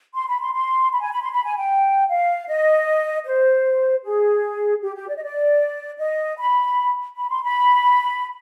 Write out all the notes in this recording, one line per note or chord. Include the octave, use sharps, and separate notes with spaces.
C6
B5
C6
C6
B5
G#5
B5
C6
B5
G#5
G5
F5
D#5
C5
G#4
G4
G4
D5
D#5
D5
D#5
B5
B5
C6
B5